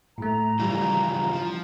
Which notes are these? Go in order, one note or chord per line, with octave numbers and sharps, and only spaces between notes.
A2 A3 A#5
C#3 E3 F3 G3
F3